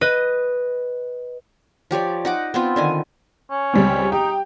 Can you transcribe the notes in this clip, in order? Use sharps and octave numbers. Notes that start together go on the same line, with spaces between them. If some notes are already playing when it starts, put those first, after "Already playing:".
B4 D#5
F3 G4 C#5 D5
D#4 F#5 D6
B3 C4 F4
D3 D#3 G#5
C#4
C#2 G3 C4
D#4 G4 G5